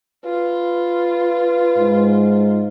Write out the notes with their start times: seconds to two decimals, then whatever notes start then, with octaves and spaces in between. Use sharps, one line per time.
0.25 F4 B4
1.77 G#2